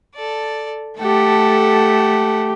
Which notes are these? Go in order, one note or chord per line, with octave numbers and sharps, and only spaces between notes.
A4 D5
A3 G4 A4 F#5